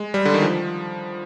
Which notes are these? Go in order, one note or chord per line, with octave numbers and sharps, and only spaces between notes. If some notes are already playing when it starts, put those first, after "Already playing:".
Already playing: G#3
G3
D3
D#3
F3